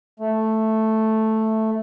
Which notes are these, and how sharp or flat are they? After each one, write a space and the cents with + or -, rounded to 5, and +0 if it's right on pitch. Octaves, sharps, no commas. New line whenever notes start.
A3 +0